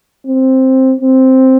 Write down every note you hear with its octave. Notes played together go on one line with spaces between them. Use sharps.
C4
C4